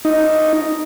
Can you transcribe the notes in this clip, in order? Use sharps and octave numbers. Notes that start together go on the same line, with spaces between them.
D#4